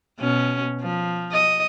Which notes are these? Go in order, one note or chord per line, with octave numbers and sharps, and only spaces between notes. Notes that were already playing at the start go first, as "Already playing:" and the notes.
B2 C#4
F3
D#5